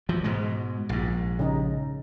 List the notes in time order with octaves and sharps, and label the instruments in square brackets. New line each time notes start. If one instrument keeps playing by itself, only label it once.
[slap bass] E3 F3
G#2 B2 G#3
A#1 G#2
[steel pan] C#3 D#4